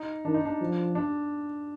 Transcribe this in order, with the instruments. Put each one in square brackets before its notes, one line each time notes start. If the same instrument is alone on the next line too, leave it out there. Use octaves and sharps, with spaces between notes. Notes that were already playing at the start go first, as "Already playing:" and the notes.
Already playing: [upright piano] D#4
[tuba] D#3 [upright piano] D4
[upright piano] D#4
D4
[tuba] F3
[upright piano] D4